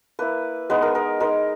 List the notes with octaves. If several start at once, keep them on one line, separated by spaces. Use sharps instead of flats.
A#3 E4 B4
G#3 B3 D#4 B4
A#4
A#4
G#3 D#4 A#4